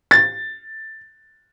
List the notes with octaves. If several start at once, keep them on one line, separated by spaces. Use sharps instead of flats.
A6